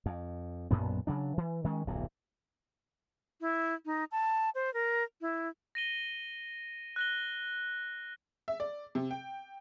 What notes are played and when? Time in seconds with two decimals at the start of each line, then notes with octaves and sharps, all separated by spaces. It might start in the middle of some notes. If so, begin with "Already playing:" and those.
0.06 F2
0.71 B1 F#2 A#2 B3
1.07 C#3 F#3 D4
1.37 E3
1.64 D#3 G#3 C#4
1.87 D1 B1 F2 A#2
3.41 E4
3.86 D#4
4.12 A5
4.55 C5
4.74 A#4
5.21 E4
5.75 A#6 D#7 G7
6.96 F#6 A#6 G7
8.48 E5
8.60 D5
8.95 C3
9.11 G5